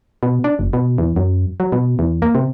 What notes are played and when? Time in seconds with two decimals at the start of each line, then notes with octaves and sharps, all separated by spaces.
0.23 B2
0.44 D4
0.59 F#1
0.73 B2
0.98 E2
1.16 F#2
1.60 F#3
1.72 B2
1.99 E2
2.22 A#3
2.35 C3